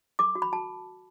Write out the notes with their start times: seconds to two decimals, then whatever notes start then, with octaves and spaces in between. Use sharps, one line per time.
0.19 A4 D6
0.35 F#4
0.42 B5
0.52 F#4 A5